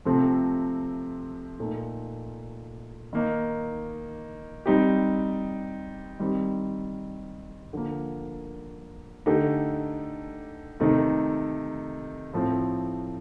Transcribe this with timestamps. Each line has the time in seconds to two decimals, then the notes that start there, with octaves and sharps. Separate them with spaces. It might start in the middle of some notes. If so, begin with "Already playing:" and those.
0.05 C3 F3 A3 C4
1.59 A#2 A3 D#4
3.13 D#3 A#3 D#4
4.66 G3 C4 D#4 G4
6.19 D#3 G3 C4 G4
7.73 D3 F3 A#3
9.26 D3 A3 D#4 G4
10.80 C3 D#3 A3 D#4
12.34 A2 F3 A3 C4